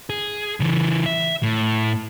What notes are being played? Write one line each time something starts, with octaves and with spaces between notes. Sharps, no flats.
G#4
C#3 E3
E5
A2